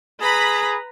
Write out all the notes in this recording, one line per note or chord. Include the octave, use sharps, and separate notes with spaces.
G#4 B4 A#5 B5